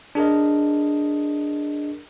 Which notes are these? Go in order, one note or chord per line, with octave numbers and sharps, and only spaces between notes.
D4 G#4 A#4 D#5